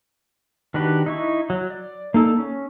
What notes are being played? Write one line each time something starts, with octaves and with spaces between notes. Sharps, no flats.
D#3 D4 F#4 G4 B4
D#4 E4 C#6
F#3
D5
A#3 D#4 A4
C#4